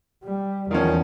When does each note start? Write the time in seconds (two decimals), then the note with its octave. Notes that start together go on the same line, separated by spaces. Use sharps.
0.23 G3
0.71 E2 D#3 F3 C#4